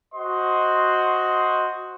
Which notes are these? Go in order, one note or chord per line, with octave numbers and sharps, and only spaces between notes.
F#4 C5 D#5 C6